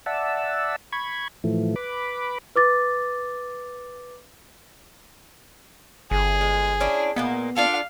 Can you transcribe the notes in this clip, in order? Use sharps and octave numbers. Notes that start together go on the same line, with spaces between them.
D5 E5 F#5 A5 E6
B5 C#6 G#6
A2 E3 F3 A3
B4 B5 D6
B4 D6 A6
G1 G#4
G#3
C#4 D4 E4
A#2 A#3 B3 D#4
D4 F4 A4 F5